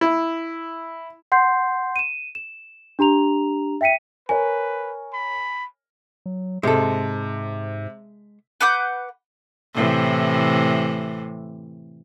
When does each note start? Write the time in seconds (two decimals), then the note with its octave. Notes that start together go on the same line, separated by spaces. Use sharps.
0.01 E4
1.32 F#5 C6 G6 C7
1.96 D#7 E7
2.35 E7
2.99 D4 G4 A#5 F7
3.81 E5 G5 B6 C#7 D#7
4.29 A#4 B4 C#5 G#5
5.13 B5
6.26 F#3
6.63 G#2 C3 G#3 A4
8.61 B4 F#5 D6 G6
9.74 A2 C3 E3